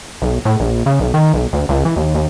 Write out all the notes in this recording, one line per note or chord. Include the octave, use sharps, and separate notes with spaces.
B1
A2
A#1
C#3
B1
D#3
B1
D2
C#2
E3
D#2
D#2